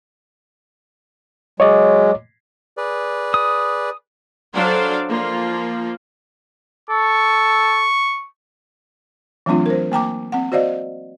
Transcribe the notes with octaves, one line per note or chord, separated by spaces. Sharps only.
F#3 G#3 C#5 D#5 D6
G#4 B4 D5
D#6
F#3 D4 A4 C5 D5 F5
F3 A#3 F4
A4 C#6
E3 F#3 A3 C4 D4 F4
A#4 C5
A#3 G5 A#5 D6
C4 F#5
F#4 C5 D5 D#5 F5